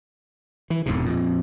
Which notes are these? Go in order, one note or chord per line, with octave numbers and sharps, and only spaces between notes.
E3
E1 E2 G#2 C3
F2 A#2